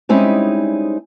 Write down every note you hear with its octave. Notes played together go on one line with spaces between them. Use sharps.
G3 G#3 C4 C#4 D#4 E4